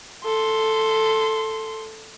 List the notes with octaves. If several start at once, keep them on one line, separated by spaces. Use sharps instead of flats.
A4 C6